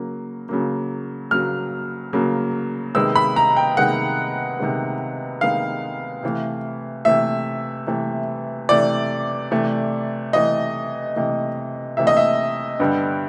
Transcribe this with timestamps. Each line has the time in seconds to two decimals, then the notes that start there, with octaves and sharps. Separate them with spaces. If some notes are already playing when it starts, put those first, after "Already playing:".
Already playing: C#3 F#3 A#3
0.49 C#3 F#3 A#3
1.31 C#3 F#3 A#3 F6
2.13 C#3 F#3 A#3
2.95 C3 D#3 G#3 B3 E6
3.16 B5
3.36 A#5
3.57 G5
3.77 C3 D#3 G#3 B3 F#5
4.59 C3 D#3 G#3 B3
5.41 C3 D#3 G#3 B3 F5
6.23 C3 E3 A3
7.05 C3 E3 A3 E5
7.87 C3 E3 A3
8.69 C3 E3 A3 D5
9.51 C3 E3 A3
10.33 C3 E3 A3 D#5
11.16 C3 E3 A3
11.97 C3 E3 A3 E5
12.07 D#5
12.17 E5
12.80 G2 D3 G3 B3